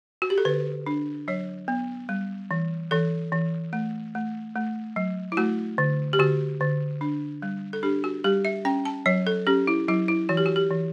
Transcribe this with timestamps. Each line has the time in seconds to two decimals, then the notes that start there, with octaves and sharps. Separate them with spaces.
0.22 F#4
0.30 G4
0.38 A4
0.45 D3 B4
0.86 D4
1.28 F#3 C#5
1.68 B3
2.09 G3
2.51 E3
2.91 E3 A4
3.32 E3
3.73 A3
4.15 A3
4.56 A3
4.96 F#3
5.32 E4
5.37 A3 F#4
5.78 D3
6.13 G4
6.19 D3 F#4
6.61 D3
7.01 D4
7.42 G3
7.73 A4
7.83 D4 G4
8.04 F#4
8.24 G3 G4
8.45 E5
8.65 C#4 G5
8.85 A5
9.06 F#3 C#5
9.27 A4
9.47 C#4 G4
9.67 E4
9.88 F#3 E4
10.08 E4
10.29 E3 F#4
10.37 G4
10.46 F#4
10.56 G4
10.71 E3